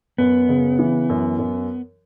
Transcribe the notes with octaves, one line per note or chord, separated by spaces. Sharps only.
F#2 B3
C#3
E3
F#2
F#2